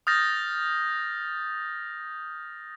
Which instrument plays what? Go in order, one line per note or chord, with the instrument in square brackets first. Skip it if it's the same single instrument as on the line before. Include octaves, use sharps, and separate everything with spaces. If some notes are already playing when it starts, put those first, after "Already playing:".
[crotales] D#6 F6 G6 A6 A#6